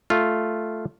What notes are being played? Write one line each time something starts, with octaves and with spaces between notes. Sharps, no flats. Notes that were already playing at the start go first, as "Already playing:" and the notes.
A3 F4